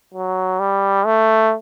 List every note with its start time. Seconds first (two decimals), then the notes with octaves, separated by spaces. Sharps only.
0.14 F#3
0.60 G3
1.06 A3